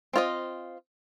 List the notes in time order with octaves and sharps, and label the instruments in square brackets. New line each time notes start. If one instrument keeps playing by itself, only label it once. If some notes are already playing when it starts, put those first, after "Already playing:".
[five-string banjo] C4 F4 A4 C5 D#5